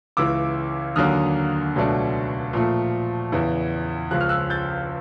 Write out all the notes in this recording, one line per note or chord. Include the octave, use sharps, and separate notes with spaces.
C#2 C#3 E3 D6 E6
D#2 D3 F#3 A#3 D#6 F6
C#2 B2 F#3 A3 D4
A#2 F3 A3
E2 C#3 E3
C#2 C#3 F3 F#6
F6
E6 F#6
G6 A6